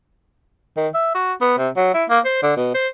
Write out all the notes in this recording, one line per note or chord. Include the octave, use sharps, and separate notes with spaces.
D#3
E5
F#4
B3
C3
F#3
E4
A#3
C5
D3
B2
C5